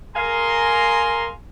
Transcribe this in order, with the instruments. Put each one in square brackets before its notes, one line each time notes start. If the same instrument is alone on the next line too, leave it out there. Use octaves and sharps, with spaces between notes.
[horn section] G#4 A#4 F5 G#5 A#5 C6